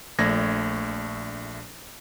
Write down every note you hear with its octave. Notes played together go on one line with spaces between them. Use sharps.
A#1 A3 D5 G#6 A#6